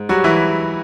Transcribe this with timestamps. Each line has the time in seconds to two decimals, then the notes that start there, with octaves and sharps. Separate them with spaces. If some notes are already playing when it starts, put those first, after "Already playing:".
Already playing: G#2
0.09 F#3 G3 F#4
0.24 E3 E4